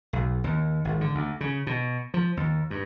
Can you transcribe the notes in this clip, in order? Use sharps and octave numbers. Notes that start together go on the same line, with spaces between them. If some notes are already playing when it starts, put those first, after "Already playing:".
B1
D#2
G#1
D3
D2
C#3
B2
F3
D#2
G2